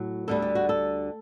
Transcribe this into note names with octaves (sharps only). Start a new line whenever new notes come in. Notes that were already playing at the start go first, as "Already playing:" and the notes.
Already playing: A2 F#3
D2 D3 G3 A4
G4
F#4
A4